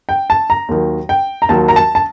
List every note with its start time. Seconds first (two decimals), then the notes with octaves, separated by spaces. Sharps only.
0.09 G5
0.30 A5
0.50 A#5
0.69 D#2 D#3 F#3
1.09 G5
1.42 A#5
1.49 D#2 D#3 F#3 A5
1.68 A#5
1.76 A5
1.95 A5